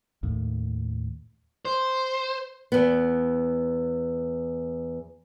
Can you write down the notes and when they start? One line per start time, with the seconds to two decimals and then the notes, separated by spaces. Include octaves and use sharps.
0.23 D#2 A2
1.65 C5
2.72 E2 B3